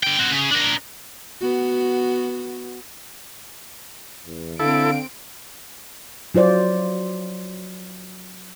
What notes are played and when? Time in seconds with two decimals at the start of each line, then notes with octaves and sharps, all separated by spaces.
0.03 D3 G5
0.19 C4 F#4
0.32 C#3
0.51 D4 A#4
1.40 B3 F#4
4.26 E2
4.60 D3 C4 E4 A4 F5 D7
6.35 F#3 F4 C5 D5